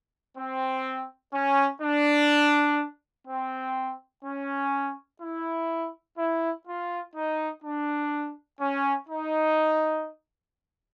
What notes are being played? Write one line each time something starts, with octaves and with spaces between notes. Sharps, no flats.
C4
C#4
D4
C4
C#4
E4
E4
F4
D#4
D4
C#4
D#4